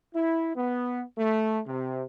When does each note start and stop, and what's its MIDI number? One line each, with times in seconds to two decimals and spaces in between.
0.14 0.50 64
0.56 1.01 59
1.17 1.59 57
1.66 2.03 48